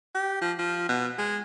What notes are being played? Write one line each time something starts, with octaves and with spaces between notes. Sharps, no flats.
G4
F3
F3
B2
G#3